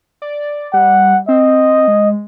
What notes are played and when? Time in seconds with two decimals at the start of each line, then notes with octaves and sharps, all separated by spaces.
0.22 D5
0.74 G3 F#5
1.29 C4 D#5
1.88 G#3